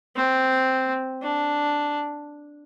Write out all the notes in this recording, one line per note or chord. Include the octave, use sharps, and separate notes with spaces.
C4
D4